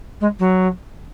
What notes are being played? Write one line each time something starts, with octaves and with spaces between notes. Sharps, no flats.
G#3
F#3